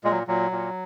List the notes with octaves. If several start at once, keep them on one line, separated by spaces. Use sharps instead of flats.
A#2 G#3
F#3
A#2 F#3
A#2